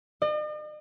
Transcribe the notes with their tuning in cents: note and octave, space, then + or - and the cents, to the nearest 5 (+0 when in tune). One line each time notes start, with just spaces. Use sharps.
D#5 -45